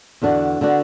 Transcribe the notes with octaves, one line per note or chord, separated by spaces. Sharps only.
E2 D3 B3 D4 F#4
D3 B3 D4 F#4